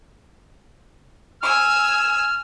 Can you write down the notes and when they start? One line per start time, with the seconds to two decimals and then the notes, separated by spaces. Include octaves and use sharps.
1.41 G#5 E6 F6